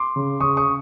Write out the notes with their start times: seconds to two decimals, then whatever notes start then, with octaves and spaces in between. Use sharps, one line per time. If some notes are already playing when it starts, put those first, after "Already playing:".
Already playing: C6 D6
0.16 C#3
0.40 C#3 C#6 D#6
0.57 C#6 D#6